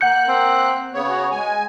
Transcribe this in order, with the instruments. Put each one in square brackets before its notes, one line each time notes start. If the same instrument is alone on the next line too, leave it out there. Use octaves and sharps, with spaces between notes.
[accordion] A#3 F#6 [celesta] F#5 G6 C#7
[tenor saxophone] C4
[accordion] C#3 B3 C#5
[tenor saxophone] F#4
[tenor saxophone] G#3 [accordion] G#5